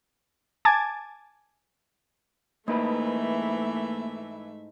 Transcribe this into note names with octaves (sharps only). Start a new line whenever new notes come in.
G#5 A5 D6 G#6 A6
G#2 E3 A3 A#3 D#4 B4 E5